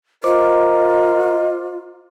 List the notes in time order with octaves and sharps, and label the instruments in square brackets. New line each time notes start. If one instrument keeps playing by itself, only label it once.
[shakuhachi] F4 [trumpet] A#4 [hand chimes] C5 D6 [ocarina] D#5